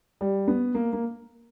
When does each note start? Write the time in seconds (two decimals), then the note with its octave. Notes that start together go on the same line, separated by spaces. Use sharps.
0.21 G3
0.48 B3
0.75 A#3
0.93 A#3